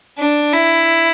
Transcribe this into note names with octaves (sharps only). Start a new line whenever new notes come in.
D4
E4